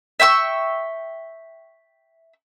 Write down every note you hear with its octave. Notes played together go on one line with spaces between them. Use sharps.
E5 G5 C#6 E6